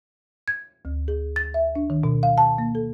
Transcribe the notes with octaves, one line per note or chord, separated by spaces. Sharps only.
G#6
D2
G#4
A6
E5
D4
D#3
B2
F5
A5
A#3
A4